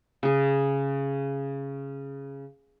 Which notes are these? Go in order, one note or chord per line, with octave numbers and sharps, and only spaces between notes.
C#3 G#4